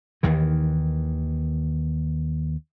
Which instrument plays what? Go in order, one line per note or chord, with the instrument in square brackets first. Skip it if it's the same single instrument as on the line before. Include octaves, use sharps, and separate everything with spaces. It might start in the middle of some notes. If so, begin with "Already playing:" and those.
[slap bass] D#2 D#3 E3